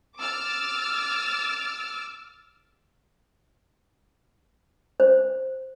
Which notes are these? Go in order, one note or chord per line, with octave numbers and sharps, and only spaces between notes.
D6 E6 F6 A6
C5